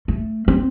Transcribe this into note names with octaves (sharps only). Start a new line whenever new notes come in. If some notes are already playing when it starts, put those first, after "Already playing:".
A3
C4